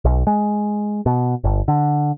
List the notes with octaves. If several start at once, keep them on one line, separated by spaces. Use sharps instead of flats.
B1
G#3
B2
G1
D3